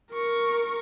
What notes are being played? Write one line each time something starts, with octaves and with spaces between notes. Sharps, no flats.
A#4 C#6